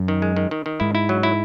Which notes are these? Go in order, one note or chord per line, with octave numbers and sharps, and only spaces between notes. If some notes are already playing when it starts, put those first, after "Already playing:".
Already playing: F#2
D#3
G#3
D#3
D#3
D#3
G#2 E4
E4
F#3
E4